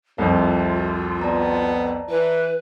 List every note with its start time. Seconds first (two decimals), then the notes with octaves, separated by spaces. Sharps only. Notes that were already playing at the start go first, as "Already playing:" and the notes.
0.18 C2 F2 C3 F4
1.22 B3 D5 A5 A#5
2.09 E3 B4